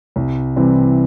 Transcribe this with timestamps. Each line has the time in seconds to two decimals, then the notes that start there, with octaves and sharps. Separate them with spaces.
0.16 C2
0.56 C3 E3 G3 C4